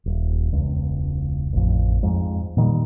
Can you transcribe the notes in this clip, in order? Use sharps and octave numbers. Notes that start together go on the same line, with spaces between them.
D#1
E1 C#2
A1 F2
F2 G#2
A#2 D#3 F#3 G3